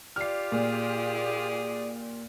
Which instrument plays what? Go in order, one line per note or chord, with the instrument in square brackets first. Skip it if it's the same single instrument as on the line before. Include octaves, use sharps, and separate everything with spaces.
[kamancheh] F4 G4 [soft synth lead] D5 [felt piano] F6 C7
[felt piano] A#2 [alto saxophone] G#4